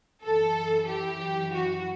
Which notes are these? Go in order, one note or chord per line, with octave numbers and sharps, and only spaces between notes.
F#2 E3 A4
G4
F#4